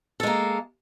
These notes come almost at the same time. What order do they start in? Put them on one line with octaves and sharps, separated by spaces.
A4 G#3 A#3